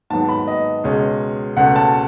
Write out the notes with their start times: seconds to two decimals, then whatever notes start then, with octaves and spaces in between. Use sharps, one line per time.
0.10 G#2 D#3 F#3 B3 A5
0.29 B5
0.48 D#5
0.84 C#2 B2 G#3 C#4
1.57 C#2 B2 A3 C#4 F#5
1.76 A5